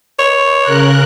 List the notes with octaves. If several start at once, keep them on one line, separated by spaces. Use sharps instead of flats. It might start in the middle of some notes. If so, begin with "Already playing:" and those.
C#5
C#3 A#4 F#6